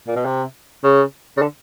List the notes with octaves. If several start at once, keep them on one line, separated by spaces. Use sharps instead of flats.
A#2
B2
C3
C#3
C#3
D3